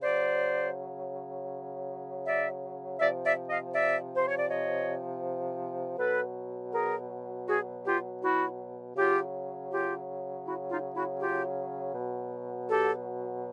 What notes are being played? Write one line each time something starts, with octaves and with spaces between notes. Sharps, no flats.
C#3 F#3 C5 D5
D5 E5
C3 F3 D5 E5
D5 E5
D#5 F5
D5 E5
C5
C#5
D5
C#5 D#5
B2 F#3 A4 B4
G#4 A#4
F#4 G#4
F4 G4
E4 F#4
C#3 F#3 F4 G4
F4 G4
E4 F#4
D#4 F4
E4 F#4
F4 G4
B2 F#3
G4 A4